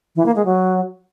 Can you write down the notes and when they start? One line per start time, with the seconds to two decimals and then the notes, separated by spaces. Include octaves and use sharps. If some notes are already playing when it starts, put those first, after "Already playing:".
0.16 E3
0.26 A#3
0.36 G#3
0.45 F#3